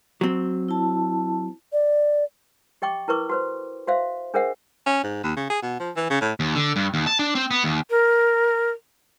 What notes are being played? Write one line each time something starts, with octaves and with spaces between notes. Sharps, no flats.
F#3 C4
E4 A5
D5
G4 D#5 G5 C#6 D6
E4 A#4 B4 C#6 D6
F#4 B4 C5
F#4 C5 E5 F5
D4 G#4 A#4 C5 E5 F#5
C#4
G#2
D#2
C#3
G#4
B2
F3
E3
C#3
A2
D#2
D3
G2
D#2
A5
D4
C4
B3
D#2
A#4